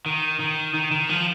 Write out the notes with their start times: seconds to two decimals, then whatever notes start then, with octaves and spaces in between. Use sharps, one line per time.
0.06 D#3
0.40 D#3
0.74 D#3
0.91 D#3
1.09 F3